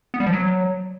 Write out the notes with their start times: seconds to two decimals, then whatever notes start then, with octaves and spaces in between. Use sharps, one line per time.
0.14 B3
0.20 G3
0.26 F3
0.33 F#3